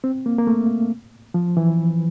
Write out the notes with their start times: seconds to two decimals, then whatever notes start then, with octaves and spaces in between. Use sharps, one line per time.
0.04 C4
0.26 A#3
0.38 A#3
0.47 A3
1.34 F3
1.57 E3